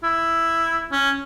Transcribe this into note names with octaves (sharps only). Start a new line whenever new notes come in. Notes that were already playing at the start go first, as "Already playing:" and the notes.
E4
C#4